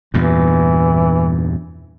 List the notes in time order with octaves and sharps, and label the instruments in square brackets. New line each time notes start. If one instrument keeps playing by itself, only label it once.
[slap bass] E2 G2 A#2 [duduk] E3